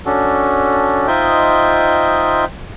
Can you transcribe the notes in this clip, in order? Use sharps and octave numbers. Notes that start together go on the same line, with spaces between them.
C#4 D4 F#4 A4
D#4 F4 C5 D#5 E5 G5